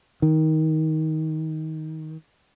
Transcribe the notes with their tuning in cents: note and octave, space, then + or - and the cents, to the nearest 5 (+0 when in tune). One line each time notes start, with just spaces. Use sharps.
D#3 +20